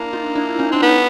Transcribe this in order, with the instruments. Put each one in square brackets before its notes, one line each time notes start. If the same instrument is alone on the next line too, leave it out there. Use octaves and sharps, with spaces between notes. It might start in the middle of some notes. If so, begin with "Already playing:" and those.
Already playing: [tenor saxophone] A#3 [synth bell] D4 E4
[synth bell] D#4 F4
D4 E4
C#4 D#4
[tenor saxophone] C4 [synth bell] D4
[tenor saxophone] B3 [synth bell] C#4 D#4